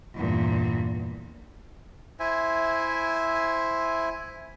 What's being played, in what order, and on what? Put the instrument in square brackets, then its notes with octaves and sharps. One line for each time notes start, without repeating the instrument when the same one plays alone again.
[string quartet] E2 G2 A#2
[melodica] E4 C5 E5 G#5